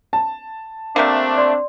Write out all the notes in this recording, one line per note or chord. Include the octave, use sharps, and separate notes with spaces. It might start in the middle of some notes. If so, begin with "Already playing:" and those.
A5
C3 A3 A#3 C4 D4
D5 C6